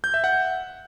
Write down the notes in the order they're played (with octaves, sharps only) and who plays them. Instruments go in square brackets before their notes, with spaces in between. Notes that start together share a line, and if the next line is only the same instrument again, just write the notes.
[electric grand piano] G6
E5
F#5